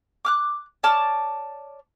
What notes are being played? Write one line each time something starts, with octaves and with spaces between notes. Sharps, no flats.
D6 F6 F#6
C#5 D5 A5 F6